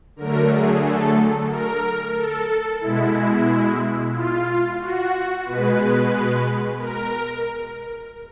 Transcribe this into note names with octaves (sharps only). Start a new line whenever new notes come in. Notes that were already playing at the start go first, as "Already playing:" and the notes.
D3 F#3 A3 A#4
G#4
A4
A#4
A4
B2 G#3 E4
F4
F#4
B2 G#3 B4
A#4